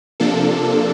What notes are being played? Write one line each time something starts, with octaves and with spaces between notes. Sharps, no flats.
C3 F3 A#3 D4 A4